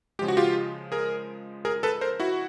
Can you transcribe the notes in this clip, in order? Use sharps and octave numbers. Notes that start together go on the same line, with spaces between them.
C#3 F3 G#3 G4
F#4
F4 G4
G#4 A#4
G#4 A#4
A4 B4
A#4 C5
E4 F#4